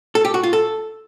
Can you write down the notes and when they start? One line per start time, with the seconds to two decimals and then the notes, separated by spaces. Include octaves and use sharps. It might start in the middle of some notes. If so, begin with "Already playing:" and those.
0.15 A4
0.25 G4
0.34 F#4
0.43 F4
0.53 A4